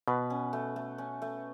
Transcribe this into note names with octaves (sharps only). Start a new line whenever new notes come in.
B2 B4
C#4
A3
A3
C#4
A3